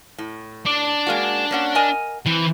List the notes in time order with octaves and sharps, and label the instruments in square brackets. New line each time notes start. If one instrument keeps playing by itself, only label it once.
[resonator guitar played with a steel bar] A2
[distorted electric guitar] D4 D5
[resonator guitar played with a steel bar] G#3 A#3 F#4
A#3 C#4 F#5
A#4 D#5 G#5
[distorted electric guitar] E3 [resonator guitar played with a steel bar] C4